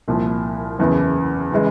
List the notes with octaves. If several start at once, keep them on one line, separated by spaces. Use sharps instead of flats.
C2 A#2 F3
F#1 E2 C#3 E3
C#3 E3 G#3